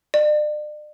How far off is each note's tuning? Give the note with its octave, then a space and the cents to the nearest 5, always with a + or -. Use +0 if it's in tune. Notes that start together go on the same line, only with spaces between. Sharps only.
D5 +40